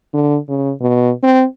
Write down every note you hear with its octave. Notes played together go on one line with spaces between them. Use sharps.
D3
C#3
B2
C4